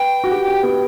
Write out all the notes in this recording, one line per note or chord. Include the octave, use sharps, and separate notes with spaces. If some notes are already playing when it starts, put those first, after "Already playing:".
Already playing: B4 G5
F#4
G4
G4
B3